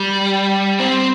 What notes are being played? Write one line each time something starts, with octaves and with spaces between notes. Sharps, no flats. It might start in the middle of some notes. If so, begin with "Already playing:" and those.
Already playing: G3
C4